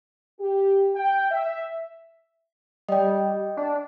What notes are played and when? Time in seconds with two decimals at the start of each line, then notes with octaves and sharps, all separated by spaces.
0.39 G4
0.95 G5
1.30 E5
2.89 G3 D#5 G5
3.57 D4